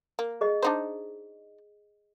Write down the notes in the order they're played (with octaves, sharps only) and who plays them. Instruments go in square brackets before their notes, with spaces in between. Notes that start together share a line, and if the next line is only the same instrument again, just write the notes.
[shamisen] A#3
[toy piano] G#4 D#5
[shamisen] D4 D#4 C5